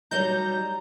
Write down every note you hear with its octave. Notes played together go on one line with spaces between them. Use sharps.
F#3 G3 D#4 A#5 G6